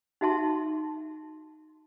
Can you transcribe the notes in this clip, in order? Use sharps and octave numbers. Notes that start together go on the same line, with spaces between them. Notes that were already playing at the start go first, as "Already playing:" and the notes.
D#4 F#4 E5 A5 C6